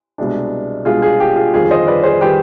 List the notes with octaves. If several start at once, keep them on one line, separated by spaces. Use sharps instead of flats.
C2 B2 G#3 D4
C2 B2 G#3 D4 F4 G#4
F4 G#4
G4
F4 G#4
G1 F2 D#3 G3 F4 G#4
C5 D#5
B4 D5
G#4 C5
D#3 G3 G4 B4